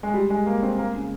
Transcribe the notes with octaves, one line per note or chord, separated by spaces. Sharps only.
G#3
G3
G#3
A#3
C4
A#3
C#3